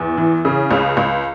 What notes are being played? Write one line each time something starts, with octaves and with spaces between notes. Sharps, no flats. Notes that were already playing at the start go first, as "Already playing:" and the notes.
Already playing: E2
E3
C#3
C#2
C#2